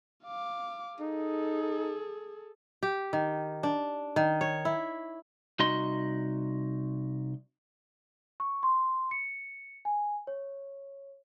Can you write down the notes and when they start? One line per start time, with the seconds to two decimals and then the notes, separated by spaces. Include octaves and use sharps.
0.25 F5 D6
1.00 D#4 G#4 A4
2.83 G4
3.13 D#3
3.63 D4
4.16 D#3
4.41 C#5
4.65 E4
5.59 C2 D#4 F#4 D#5 C6
8.40 C#6
8.63 C6
9.11 C#7
9.85 G#5
10.27 C#5